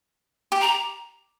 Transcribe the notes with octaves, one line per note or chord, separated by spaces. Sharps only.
G4
A#5